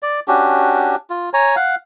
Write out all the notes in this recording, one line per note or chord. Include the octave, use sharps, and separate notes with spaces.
D5
C#4 D4 F#4 G4
F4
C#5 G#5 A#5
F5 F#5